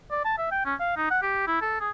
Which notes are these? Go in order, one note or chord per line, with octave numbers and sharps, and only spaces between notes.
D5
A5
E5
G5
C#4
F5
D#4
F#5
G4
E4
A4
G#4